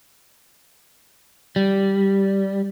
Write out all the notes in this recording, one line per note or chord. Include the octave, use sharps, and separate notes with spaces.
G3